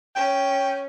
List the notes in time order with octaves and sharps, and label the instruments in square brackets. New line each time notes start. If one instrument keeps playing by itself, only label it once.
[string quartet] C#4 [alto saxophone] G5